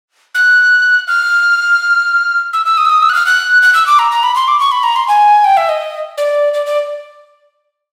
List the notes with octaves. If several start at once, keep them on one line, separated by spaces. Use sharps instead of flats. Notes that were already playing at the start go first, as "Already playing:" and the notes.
F#6
F6
E6
E6
D#6
E6
D#6
E6
F#6
F6
F#6
F#6
E6
D6
A#5
A#5
B5
C6
D6
C#6
B5
A#5
C6
G#5
G5
E5
D#5
D5
D5
D5